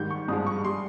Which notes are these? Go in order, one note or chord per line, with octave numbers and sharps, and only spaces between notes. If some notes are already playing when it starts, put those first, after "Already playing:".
Already playing: G#2 D#3 G3 G6
C#6
G2 F3 G#3 D#6
C#6
G3 C6